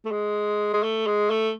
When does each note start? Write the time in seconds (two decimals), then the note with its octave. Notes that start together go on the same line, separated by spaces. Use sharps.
0.05 A3
0.11 G#3
0.73 G#3
0.83 A3
1.06 G#3
1.30 A3